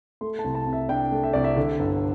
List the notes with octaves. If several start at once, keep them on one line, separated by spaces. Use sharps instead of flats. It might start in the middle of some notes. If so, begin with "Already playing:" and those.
A3 C6
A5
C2
A5
C3
E5
D4 G5
A3
E5
C2 D5
E5
D3
G1